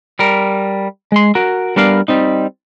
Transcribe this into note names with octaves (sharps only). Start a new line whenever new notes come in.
G3 A#4
G#3 C6
F#4 A#4
G3 B3 D4 A#4 D5 F5
G3 C4 D#4